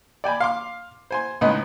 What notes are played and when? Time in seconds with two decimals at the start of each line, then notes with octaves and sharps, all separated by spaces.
0.24 D5 G5 G#5 B5
0.40 F5 C6 D6
1.11 C5 G#5 C6
1.41 C#2 A2 D#4 B4 D#5